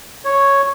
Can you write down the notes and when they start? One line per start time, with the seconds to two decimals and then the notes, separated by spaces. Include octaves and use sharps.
0.25 C#5